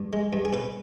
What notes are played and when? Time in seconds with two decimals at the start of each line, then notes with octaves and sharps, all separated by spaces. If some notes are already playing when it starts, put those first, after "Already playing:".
Already playing: G2
0.13 G#3
0.33 G2
0.45 G#4
0.53 B2 B4